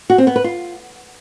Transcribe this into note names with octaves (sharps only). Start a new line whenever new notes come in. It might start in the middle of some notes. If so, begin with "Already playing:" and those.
F#4
C4
B3
B4
F4